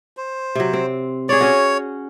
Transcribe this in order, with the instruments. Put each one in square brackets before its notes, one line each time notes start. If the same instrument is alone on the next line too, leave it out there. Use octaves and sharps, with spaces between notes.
[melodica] C5
[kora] C3 F#3
C4
[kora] G#4 D5 [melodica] C#5
[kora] C#4 F#4